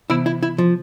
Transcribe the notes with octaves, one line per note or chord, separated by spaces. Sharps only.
C3 E3 B3 E4
E4
E4
F3